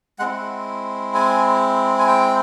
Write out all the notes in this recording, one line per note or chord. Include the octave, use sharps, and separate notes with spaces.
G#3 C4 E4 F#5
G#5
G#5
G5